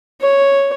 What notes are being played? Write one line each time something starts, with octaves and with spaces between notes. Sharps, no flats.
C#5